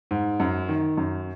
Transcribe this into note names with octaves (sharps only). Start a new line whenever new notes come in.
G#2
F#2
D#3
F#2